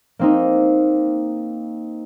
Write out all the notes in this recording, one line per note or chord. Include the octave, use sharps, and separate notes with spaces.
A#3 C4 D#4